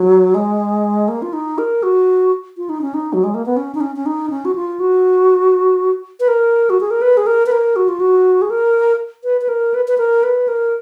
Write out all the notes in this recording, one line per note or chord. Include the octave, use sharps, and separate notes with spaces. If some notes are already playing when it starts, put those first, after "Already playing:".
Already playing: F#3
G#3
A#3
F4
D#4
A#4
F#4
F4
D#4
C#4
D#4
F#3
G#3
A#3
B3
C#4
D#4
C#4
C#4
D#4
C#4
F#4
F4
F#4
B4
A#4
F#4
G#4
A#4
B4
G#4
A#4
B4
A#4
F#4
F4
F#4
G#4
A#4
B4
B4
A#4
B4
B4
A#4
B4
A#4